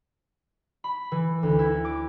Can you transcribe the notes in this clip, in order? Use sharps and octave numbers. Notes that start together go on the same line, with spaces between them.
B5
E3
D2
E4
D6